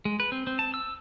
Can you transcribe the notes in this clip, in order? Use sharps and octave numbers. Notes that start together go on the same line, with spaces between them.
G#3
B4
C4
C4
A5
E6